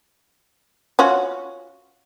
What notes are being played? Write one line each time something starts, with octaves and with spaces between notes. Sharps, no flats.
C#4 F4 F#4